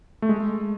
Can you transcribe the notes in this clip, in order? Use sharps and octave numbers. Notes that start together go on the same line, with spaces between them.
A3
G#3